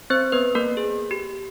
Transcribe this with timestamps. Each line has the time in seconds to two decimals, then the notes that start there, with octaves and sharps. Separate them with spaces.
0.10 C4 C5
0.32 B3 B4
0.55 A#3 A#4
0.77 G#4
1.11 G4